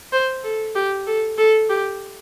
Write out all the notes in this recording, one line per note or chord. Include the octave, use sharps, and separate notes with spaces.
C5
A4
G4
A4
A4
G4